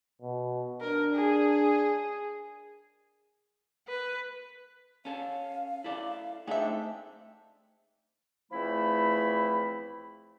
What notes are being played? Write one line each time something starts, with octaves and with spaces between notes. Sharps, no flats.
B2
D4 A#4
G#4
B4
C#4 A4 F5
E4 A4 D5
A3 C4 D4 D#4 G#4 E5
E2 F3 A3 C4 E4 B5